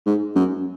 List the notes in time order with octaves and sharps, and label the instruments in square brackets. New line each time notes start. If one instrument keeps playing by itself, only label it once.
[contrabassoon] G#2
F#2